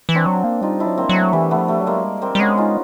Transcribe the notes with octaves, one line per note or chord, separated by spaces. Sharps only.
E3
C4 D4
F#3
A#3
G3 D#4 F4
D4 E4
F#3
A#3 C4
F#3
A3 B3
E3 G3 A3
A3 B3
F3
G3 A3
F#3
G#3 A#3
G3
A#3 C4
G3
G#3 B3 C#4
D#4 F4